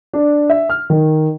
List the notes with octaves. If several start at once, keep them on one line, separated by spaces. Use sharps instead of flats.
D4
E5
F6
D#3